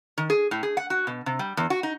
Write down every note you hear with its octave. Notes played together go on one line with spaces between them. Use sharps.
D#3
G#4
A2
G#4
F#5
F#4
B2
C3
G3
E2
F#4
D#4